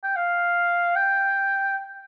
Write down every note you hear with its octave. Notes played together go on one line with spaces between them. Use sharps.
G5
F5
G5